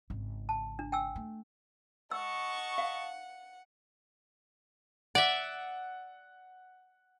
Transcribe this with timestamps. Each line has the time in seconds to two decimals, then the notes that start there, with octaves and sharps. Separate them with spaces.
0.10 G#1 C#3
0.49 A5
0.79 D4
0.92 G5 G#5 E6
1.16 A3
2.11 D#5 F#5 A5 C#6 E6
2.78 F5
5.15 D5 E5 F#5